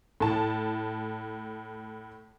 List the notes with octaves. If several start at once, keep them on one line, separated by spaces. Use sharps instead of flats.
A2 A5